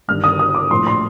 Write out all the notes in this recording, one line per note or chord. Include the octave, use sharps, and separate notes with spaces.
G1 G2 D#3 F6
D#6
D#6
D6
A#1 A2 F3 C6
C6